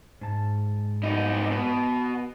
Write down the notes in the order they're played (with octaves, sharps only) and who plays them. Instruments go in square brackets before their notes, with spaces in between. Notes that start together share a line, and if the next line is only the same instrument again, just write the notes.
[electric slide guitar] G#2 A5
[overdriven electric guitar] C2 D#4
B2